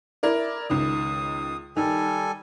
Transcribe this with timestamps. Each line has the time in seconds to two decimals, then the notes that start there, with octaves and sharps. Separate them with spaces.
0.23 E4 A#4 D5
0.70 C#2 D#3 D#6
1.77 D#3 G3 A4 G#5